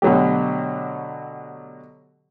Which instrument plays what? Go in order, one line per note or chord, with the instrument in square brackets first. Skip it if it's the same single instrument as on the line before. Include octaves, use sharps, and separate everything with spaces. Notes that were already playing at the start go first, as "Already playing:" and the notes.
[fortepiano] B2 D3 F#3 A3 G4